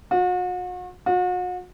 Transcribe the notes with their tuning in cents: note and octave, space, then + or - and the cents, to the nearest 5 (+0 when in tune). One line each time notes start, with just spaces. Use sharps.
F#4 -40
F#4 -40